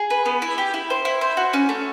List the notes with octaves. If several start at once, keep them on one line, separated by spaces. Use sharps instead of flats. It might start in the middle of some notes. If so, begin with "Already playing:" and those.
Already playing: G#4
B4
B3
E4
G4
E4
C5
E4
C5
F#4
C#4
A3